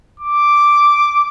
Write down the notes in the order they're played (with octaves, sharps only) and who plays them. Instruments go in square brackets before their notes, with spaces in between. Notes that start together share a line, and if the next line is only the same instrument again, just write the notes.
[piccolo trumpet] D6